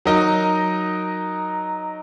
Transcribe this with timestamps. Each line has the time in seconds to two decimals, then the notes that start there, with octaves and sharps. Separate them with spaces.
0.06 F#3 D#4 A#4 D#5